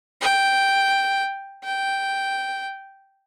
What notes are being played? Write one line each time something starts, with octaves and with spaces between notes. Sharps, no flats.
G5
G5